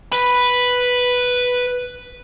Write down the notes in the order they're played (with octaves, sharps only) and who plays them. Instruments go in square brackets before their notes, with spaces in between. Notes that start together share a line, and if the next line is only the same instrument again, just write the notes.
[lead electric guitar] B4 B5